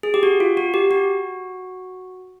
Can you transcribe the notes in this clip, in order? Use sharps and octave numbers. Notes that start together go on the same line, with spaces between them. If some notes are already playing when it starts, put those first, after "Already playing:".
G#4
G4
F#4
F4
F#4
G4
F#4